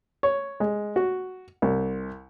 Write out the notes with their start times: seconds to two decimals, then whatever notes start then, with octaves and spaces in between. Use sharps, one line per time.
0.23 C#5
0.60 G#3
0.96 F#4
1.62 C2